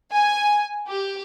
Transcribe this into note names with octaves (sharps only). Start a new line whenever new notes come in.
G#5
G4